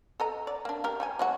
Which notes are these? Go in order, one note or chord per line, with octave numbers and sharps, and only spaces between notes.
A4 D#5 A#5
D5
A#3 D4
G4 A#4
G3 G4 G#5
F#3 G#3 F#4